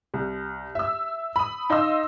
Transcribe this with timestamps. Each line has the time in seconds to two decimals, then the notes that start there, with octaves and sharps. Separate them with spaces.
0.14 C2
0.75 E5 E6
1.36 B5 D#6
1.70 D#4 D#5 F5 C6 E6